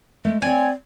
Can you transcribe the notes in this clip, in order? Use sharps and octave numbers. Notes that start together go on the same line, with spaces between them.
G#3 A3
C4 C#5 D5 G5 G#5